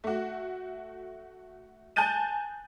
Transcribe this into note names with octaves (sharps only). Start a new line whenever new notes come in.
A3 F#4
G#5 A5 F#6 G6 A6 D#7